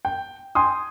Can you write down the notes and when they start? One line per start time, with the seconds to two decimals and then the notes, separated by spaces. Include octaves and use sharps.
0.05 G5
0.55 G5 G#5 C6 D#6